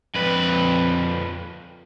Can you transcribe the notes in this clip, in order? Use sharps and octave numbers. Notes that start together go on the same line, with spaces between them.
F2 B4